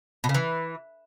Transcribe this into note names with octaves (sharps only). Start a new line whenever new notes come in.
B2
C#3
E3